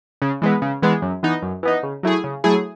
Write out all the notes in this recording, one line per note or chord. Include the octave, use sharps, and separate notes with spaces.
C#3
E3 G#3 B3
C#3
E3 G#3 B3
F#2
E3 B3 D#4
F#2
E3 B3 D#4
C#3
F#3 A3 E4 G#4
C#3
F#3 A3 E4 G#4